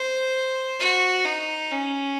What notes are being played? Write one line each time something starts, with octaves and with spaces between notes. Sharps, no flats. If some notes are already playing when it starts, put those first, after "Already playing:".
Already playing: C5
F#4
D#4
C#4